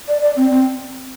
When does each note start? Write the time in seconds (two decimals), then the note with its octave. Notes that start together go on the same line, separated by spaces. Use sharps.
0.08 D5
0.21 D5
0.36 C4
0.51 C4